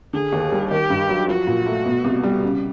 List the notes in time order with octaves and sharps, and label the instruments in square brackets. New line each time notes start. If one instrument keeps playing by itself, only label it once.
[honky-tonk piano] D3 [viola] G#4
[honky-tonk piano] D#2
G3
[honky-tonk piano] D#3 [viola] G4
[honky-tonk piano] G2
F#3
[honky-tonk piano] F3 [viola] F#4
[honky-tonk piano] A#2
A3
B2
C2
G3
C#3